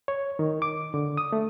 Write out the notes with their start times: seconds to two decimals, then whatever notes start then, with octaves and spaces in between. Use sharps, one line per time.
0.08 C#5
0.39 D#3
0.62 D6
0.94 D3
1.17 D#6
1.32 A3